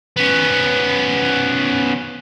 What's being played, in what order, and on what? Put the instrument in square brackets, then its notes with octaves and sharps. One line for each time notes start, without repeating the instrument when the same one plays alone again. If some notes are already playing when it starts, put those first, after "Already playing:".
[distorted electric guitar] B3 C#4